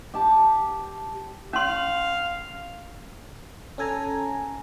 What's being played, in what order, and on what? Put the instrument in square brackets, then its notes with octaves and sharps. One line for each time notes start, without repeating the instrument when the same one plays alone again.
[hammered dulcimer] G4 A5
[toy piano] C#4 C6 [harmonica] F5
[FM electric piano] C#4 A4 G#5 A#5